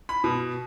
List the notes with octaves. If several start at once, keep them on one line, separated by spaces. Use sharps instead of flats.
B5
B2